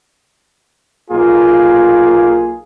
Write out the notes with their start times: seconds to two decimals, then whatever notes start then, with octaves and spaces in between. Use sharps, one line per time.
1.10 B1 A#3 F4 G#4